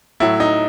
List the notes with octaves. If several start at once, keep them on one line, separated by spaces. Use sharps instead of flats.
A2 F#3 E4
D#4